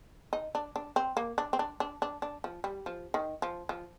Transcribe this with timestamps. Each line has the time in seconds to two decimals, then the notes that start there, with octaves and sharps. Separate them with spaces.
0.33 D#4
0.55 D4
0.76 D4
0.96 C4
1.17 A#3
1.38 D4
1.53 C4
1.59 D4
1.80 D4
2.02 D4
2.22 D4
2.44 F3
2.64 G3
2.86 F3
3.14 D#3
3.42 F3
3.69 F3